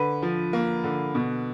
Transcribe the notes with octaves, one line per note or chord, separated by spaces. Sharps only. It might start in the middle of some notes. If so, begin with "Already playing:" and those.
Already playing: D3 B4
F3
A#3
D3
B2